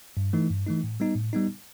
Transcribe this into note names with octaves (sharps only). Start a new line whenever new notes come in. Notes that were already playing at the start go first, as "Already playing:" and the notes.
G2
E3 A3 D#4
G2
E3 A3 D#4
A2
G3 B3 D#4
A2
G3 B3 D#4